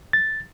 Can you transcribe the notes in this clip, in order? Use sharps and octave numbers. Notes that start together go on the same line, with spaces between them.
A6